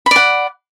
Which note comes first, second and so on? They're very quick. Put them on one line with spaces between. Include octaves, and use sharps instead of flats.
B5 D5 F#5